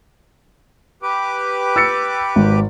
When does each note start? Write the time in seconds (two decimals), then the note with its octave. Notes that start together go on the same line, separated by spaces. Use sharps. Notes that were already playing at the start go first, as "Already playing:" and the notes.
1.02 G4 B4 D6
1.76 E6 A6 C#7
2.36 G#1